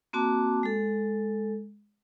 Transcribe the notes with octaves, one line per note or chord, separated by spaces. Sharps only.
A#3 C4 F#4 A5 D6
G#3 A4